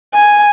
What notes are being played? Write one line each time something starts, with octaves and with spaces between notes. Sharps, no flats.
G#5